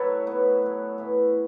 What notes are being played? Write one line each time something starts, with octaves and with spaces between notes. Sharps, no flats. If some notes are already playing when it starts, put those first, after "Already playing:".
Already playing: A2 F#3 A4 B4 C#5
A2 F#3 B3
A2 F#3
A2 E3